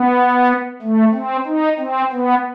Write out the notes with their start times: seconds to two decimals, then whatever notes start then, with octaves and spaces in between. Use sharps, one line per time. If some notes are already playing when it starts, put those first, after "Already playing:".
Already playing: B3
0.83 A3
1.14 C4
1.46 D#4
1.79 C4
2.12 B3